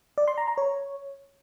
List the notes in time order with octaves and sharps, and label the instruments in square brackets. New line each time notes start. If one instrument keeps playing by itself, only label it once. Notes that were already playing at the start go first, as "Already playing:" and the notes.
[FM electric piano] D5
C6
A#5
A#5
C#5